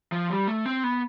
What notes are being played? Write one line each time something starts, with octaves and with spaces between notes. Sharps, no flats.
F3
G3
A3
C4
B3